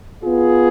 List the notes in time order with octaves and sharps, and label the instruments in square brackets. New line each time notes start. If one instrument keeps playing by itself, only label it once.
[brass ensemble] B3 F4 G#4